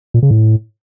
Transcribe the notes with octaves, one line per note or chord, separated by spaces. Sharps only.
A#2
C#3
A2